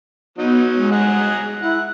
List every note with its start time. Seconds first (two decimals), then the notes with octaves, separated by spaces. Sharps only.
0.38 F#3 B3 D#4
0.75 G#3
0.91 G#4 F#5 A#5
1.62 E4 F#5